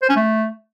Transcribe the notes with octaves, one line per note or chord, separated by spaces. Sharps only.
C5
C#4
A3